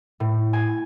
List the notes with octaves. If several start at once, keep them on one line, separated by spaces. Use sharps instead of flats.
A2
G#5